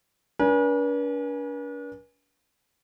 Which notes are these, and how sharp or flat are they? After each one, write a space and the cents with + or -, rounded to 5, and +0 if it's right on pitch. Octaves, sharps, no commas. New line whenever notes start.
D4 -40 B4 -45 G#5 +0